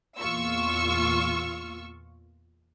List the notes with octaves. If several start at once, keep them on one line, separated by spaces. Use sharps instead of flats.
E2 A#2 F4 C#6 E6